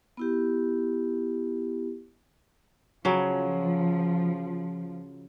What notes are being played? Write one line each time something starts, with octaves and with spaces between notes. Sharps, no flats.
B3 E4 G4
C#3 F3 F#3